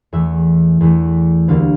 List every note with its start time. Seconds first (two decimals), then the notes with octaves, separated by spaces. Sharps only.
0.13 E2 E3 A3 E5
0.81 E2 E3 A3
1.48 D2 D3 G3 A#3 F5